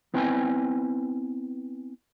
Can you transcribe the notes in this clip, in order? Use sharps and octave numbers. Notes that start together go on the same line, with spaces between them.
B3 C4 E4 B4 G5 G#5